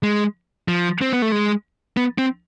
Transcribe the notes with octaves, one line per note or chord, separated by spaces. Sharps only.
G#3
F3
C4
B3
A3
G#3
B3
C4